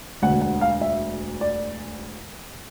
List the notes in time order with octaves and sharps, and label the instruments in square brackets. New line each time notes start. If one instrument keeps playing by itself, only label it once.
[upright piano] E1 D2 D3 F#5
F#5
F5
E5
D5